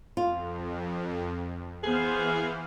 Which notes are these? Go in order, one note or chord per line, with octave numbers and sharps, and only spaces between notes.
F2 F4
E3 B3 G#4 C5 F5